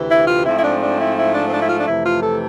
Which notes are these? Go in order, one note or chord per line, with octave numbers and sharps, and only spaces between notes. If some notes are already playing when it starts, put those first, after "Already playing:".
Already playing: D2 C3 E3
E4
F4
G#2 F3 A3 C4 E4
E4
D4
D4
E4
E4
D4
C4
D4
E4
F4
D4
F2 C3 E3 A3 E4
F4
A4